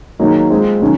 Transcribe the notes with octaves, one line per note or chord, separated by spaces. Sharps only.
D#3 F#3 A#3 D#4 G#4
G#3 C4 F4
D#3 F#3 C#4 F#4